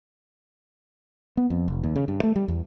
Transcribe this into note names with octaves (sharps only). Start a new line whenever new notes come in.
B3
F2
F1
D#2
C#3
G2
A3
G3
E2